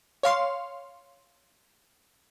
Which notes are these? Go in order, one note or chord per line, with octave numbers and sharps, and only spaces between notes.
C#5 F5 C6